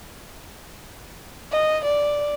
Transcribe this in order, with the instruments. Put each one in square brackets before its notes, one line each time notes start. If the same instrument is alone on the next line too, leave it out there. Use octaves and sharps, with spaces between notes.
[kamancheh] D#5
D5